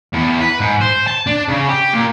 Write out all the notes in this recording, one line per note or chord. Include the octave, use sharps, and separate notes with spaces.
E2
B4
G#2
C5
A5
D4
C#3
G4
A#2